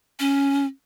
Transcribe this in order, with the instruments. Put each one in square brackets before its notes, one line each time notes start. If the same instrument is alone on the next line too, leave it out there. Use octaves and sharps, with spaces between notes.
[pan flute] C#4